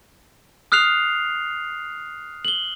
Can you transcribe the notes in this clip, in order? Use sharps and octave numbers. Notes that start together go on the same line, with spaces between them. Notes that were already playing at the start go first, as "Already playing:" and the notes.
D#6 F6 F#6 C7 F7
F#7 G7